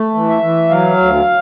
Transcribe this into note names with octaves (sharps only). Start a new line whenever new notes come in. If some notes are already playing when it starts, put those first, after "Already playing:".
Already playing: A3
E3
E5
E3
F#3 F5
D2